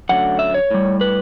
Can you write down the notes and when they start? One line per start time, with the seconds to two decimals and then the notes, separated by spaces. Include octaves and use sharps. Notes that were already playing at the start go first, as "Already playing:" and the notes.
0.09 F#2 D3 F#3 A3 F#5
0.39 E5
0.54 C#5
0.71 A2 G3
1.01 B4